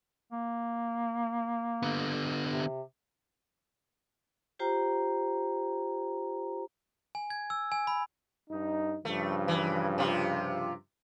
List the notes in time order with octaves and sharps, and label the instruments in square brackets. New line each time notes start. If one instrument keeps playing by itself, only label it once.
[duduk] A#3
[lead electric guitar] D3 B3
[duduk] C3
[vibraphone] F4 G4 C5 G5 A#5
[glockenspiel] G#5
G#6
E6
G#5
B5
[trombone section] G2 D#4
[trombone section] G2 C#3 F3 [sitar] A3
[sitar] E3
C3 F4